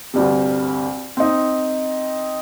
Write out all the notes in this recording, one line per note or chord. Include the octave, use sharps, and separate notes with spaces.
D2 G2 C3
C4 D#4